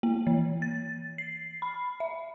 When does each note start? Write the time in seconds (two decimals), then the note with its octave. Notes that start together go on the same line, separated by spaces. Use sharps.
0.03 A#3
0.27 E3
0.62 A6
1.18 C7
1.62 B5
2.00 E5